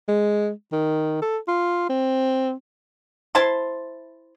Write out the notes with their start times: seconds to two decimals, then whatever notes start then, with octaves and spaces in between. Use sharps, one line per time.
0.08 G#3
0.72 D#3
1.22 A4
1.48 F4
1.89 C4
3.35 E4 C5 A5 C6